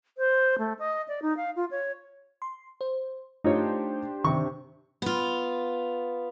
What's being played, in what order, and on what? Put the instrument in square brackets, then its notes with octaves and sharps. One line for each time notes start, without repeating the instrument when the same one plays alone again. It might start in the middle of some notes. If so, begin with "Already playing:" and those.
[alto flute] C5
A3
D#5
D5
D#4
F5
F4
C#5
[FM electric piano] C6
C5
[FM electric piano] A3 [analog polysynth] D4 G4 C5 [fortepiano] D#4 F4 C#5
[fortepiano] C3 C#6 [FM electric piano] D#3
[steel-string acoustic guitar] B3 F4